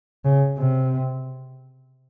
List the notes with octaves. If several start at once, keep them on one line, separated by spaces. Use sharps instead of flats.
C#3
C3